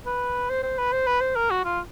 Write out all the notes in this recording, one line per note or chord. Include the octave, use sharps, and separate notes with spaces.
B4
C5
C5
B4
C5
B4
C5
A#4
F#4
F4